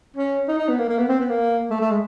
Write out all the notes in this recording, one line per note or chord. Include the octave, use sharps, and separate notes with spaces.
C#4
D#4
D#4
B3
A#3
A#3
B3
C4
B3
A#3
A3
A3
G#3